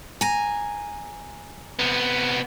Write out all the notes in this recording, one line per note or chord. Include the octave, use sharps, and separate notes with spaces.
G#5 A#5
C3 B3